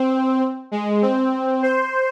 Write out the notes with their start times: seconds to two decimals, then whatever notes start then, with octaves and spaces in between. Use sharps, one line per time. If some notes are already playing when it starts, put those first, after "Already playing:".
Already playing: C4
0.71 G#3
1.02 C4
1.63 C5